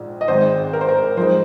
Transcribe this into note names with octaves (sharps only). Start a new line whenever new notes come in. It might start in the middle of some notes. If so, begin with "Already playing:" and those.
Already playing: A#1 G#2
D#5
G#1 G#2 G#3 C4 C5
A#4
C5
A#4
F2 F3 G#3 D#4 C5